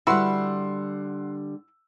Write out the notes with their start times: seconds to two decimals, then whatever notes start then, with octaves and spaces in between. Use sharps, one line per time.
0.07 D3 G3 E4 F#4 B4 F#5 C6 E6